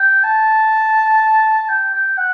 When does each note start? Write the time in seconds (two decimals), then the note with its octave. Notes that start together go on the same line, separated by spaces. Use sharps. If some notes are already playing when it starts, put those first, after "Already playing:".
Already playing: G5
0.24 A5
1.69 G5
1.93 G5
2.18 F#5